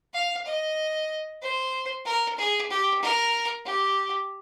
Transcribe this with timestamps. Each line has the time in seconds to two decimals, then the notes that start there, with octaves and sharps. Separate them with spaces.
0.14 F5
0.46 D#5
1.42 C5
2.05 A#4
2.38 G#4
2.70 G4
3.02 A#4
3.66 G4